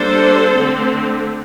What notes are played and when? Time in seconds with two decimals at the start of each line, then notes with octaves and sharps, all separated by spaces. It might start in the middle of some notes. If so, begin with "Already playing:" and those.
Already playing: G3 A#3 D4 A4 C5
0.53 D3 A3 C4